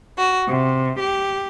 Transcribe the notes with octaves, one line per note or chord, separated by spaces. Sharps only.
F#4
C3
G4